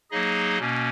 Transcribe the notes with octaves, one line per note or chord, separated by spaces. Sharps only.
F#3 A#3 D#4 G#4 D#5
B2 A#3 C#4